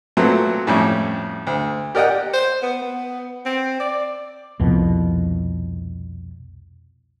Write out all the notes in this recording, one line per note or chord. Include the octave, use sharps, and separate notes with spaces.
A#2 F#3 A3 B3 C4
F2 A2 G3 C#4 E4
D2
G4 A#4 D5 D#5 F#5 G5
C5
B3
B3
C4
D5
C2 F2 B2